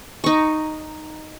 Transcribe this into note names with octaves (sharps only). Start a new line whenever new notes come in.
D#4 C#6